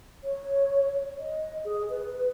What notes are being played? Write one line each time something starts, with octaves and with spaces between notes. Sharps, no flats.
C#5
D#5
G#4
B4